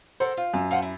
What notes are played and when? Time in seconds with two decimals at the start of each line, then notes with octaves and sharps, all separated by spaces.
0.20 A4 A#4 C5 F#5
0.37 F4
0.54 F#2
0.71 F4 C5 F#5
0.82 E4